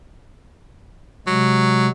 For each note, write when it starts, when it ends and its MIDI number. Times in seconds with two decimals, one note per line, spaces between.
1.27 1.88 48
1.27 1.88 54
1.27 1.88 56